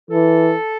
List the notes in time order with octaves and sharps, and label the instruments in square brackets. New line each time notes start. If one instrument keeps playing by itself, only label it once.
[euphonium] E3 [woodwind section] A4